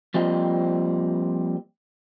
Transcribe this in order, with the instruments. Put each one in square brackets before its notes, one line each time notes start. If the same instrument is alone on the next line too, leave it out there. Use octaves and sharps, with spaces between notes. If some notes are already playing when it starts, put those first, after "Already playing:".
[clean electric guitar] F3 G3 A#3 C4 F4 D#5